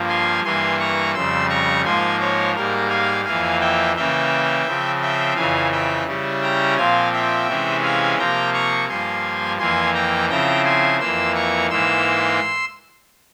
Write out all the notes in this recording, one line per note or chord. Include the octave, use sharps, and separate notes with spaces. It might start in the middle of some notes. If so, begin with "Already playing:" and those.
Already playing: G2 F3 A#3
G#5 C6
G2 E3 A#3 G#5 C6
A#5 C#6
F2 C#3 G3 C6 E6
A#5 C#6
G#2 F3 A#3 G#5 C6
A#4 C#5
G#2 G3 A#3 A#4
F5 G#5
F2 E3 A#3 F5 G#5
E5 G5
C#3 E3 A#3 E5 G5
C#3 F3 C4
E5 G5
F2 C#3 E3 F5 G#5
E5 G5
C#3 G3 C#4 E4
G5 A#5
A#2 F3 C4 F5 G#5
E5 G5
C3 E3 G#3 C#4 E4
F5 G#5
C3 F3 A#3 G5 A#5
A#5 C#6
G2 F3 A#3 G#5 C6
F2 E3 A#3 G#5 C6
G5 A#5
C#3 F3 C4 E4 G5 A#5
G#5 C6
F2 E3 A#3 C6 E6
A#5 C#6
G#2 E3 A#3 C6 E6